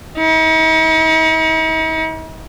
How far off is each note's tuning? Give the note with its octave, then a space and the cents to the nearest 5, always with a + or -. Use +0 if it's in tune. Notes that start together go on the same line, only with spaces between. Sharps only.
D#4 +45